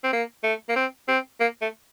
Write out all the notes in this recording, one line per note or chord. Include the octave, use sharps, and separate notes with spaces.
C4
A#3
A3
A#3
C4
C4
A#3
A3